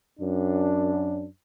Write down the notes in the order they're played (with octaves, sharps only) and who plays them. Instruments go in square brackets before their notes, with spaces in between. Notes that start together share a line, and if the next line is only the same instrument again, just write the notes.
[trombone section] F#2 D4